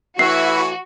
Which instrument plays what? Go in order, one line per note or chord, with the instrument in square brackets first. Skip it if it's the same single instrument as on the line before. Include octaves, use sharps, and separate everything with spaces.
[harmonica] E3 A3 C#5 [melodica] E4 B4 E5 [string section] F#4 [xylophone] C7